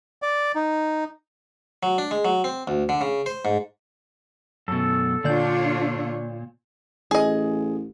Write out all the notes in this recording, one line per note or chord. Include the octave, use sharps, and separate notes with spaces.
D5
D#4
F#3
D4
G#3
F#3
C4
D2
D3
C#3
C5
G#2
F#2 B2 A4
A#2 D3 D4 F4 C#5 D5 G6
A1 G#4 D#5